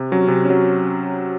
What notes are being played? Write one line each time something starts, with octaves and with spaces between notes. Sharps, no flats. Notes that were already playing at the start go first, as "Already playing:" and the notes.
Already playing: C3
F#3 C#4
C3
F#3 C#4